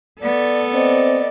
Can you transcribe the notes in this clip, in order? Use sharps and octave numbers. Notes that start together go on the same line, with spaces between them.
B3 A4 D5
C4 D5 D#5